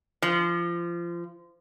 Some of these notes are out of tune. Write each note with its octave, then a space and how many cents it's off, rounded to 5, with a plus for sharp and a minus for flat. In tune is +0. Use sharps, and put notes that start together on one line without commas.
F3 -25